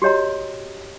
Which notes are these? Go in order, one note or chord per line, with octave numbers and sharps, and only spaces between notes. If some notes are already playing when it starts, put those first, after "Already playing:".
F#4 G4 C#5 D#5 A#5